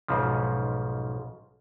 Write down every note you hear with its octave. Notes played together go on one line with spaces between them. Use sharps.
B1 G#2 C#3 F3